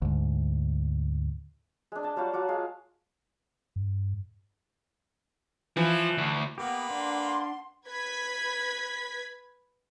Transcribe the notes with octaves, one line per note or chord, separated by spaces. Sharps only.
D2 G#2
G#3 D4
D#5 A5
F#3 G3 F4 F#4
F#3 F4 F#5 D6
G#3 F5
G2
E3 F3
D2
A#3 B3 G4 B4 F#5
D4 C6
B4 G#6 B6